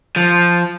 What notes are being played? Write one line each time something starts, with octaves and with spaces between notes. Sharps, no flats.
F3